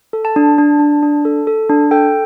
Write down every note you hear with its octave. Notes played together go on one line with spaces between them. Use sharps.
A4
A5
D4
D4
D4
D4
A4
A4
D4
A4 G5